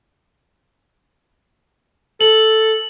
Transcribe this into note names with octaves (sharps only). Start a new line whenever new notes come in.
A4 F#7